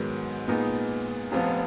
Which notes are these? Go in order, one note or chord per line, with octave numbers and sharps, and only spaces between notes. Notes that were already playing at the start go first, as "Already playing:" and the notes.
Already playing: G#2 D#3 F#3 B3
A#2 G#3 B3 D#4
F1 F2 F3 B3 F4